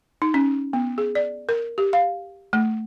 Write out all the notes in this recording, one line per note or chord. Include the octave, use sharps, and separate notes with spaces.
D#4
C#4
B3
G#4
D5
A#4
G4
F5
A3